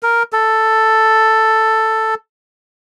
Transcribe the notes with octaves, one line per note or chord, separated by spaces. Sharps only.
A#4
A4